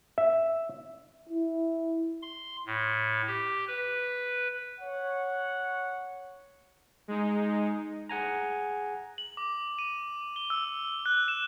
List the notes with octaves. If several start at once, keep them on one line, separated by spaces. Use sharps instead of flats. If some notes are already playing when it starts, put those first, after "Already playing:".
E5
E4
C6
A2
G4
B4
C#5 F#5
G#3 D#4
G#4 F#5 G#5 A#5
F#7
D6
D#7
G7
E6
F#6
E7